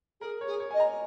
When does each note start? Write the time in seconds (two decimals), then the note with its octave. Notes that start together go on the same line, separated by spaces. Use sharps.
0.21 G#4 A#4
0.41 C#5
0.47 G#4
0.60 C#5
0.71 D#5 G#5
0.80 A#5